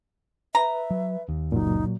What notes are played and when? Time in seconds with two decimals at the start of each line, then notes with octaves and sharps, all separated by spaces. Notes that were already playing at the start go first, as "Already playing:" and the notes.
0.55 B4 E5 A#5
0.91 F#3
1.29 D#2
1.52 F#1 C#2 F#2 A#2 F#3 D#4